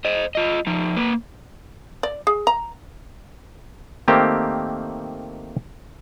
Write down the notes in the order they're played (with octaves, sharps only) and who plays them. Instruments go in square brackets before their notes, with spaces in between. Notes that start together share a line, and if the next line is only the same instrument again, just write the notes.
[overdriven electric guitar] C5 D#5
F4 D#5
F3 D#4
A#3 B4
[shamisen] D5
G#4
A#5
[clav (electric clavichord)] D#3 A3 A#3 C4 G4